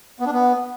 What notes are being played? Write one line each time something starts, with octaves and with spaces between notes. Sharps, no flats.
B3
D4
B3